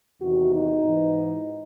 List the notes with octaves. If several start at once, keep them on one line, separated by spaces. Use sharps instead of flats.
E2 C3 D#3 F#4
D#4
G#2 E3